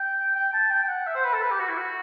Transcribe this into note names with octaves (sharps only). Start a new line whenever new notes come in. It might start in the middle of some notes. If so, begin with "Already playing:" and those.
Already playing: G5
G5
A5
G5
G5
F#5
E5
C5
B4
A4
B4
G4
F#4
E4
F#4